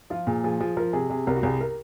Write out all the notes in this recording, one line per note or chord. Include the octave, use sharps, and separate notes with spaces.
F3 F4
A#2 G#4
F3 G#4
F3 G#4
F3 A#4
C3 G#4
C3 G#4
C2 A#4
F#4
C2 G#4
A#4